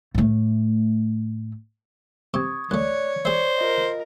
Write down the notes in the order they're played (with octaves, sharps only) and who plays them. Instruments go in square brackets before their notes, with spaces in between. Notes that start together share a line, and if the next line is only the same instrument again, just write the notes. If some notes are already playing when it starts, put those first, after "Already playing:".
[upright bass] A2 A3
[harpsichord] C3 [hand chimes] C#6 D#6 G#6
[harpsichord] D2 A3 [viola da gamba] C#5 [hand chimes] D5 F#6
[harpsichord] G#4 E5 [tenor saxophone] C5 [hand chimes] D5
[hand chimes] F4 D#5 [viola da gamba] A#4